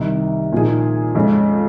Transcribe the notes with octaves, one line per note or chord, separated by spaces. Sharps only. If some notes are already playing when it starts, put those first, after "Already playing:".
Already playing: C2 C3 D#3
A#2 F3 A#3 D#4 G#4
F2 C#3 G#3